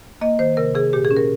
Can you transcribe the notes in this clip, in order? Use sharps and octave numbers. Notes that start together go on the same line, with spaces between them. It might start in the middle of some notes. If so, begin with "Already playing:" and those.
A#3 D#5
D#3 C5
C3 A#4
C3 G#4
A#2 G4
G#4
C#4
A#4